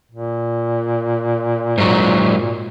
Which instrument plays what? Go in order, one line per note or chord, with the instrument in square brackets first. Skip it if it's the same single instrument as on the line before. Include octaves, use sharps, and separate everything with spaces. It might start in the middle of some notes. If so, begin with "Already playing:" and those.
[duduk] A#2
[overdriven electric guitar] G#2 F#3